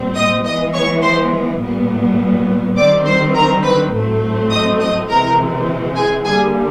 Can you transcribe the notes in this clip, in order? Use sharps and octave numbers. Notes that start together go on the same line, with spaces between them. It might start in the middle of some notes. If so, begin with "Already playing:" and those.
Already playing: A#2 G3 C4
D#5 D#6
E3 G#3 B3 D#5 D#6
C#5 C#6
C5 C6
A#2 G3 B3
D#3 G3 C4 D5 D6
C5 C6
A#4 A#5
B4 B5
A2 F#3 A3 C4
D#5 D#6
D#5 D#6
C3 E3 G#3 C4 A#4 A#5
G#4 G#5
D3 G3 A#3 G#4 G#5